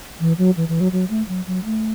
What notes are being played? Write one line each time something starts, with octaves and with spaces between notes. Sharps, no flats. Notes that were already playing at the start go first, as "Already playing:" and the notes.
E3
F#3
E3
E3
F#3
F#3
A3
F#3
F#3
A3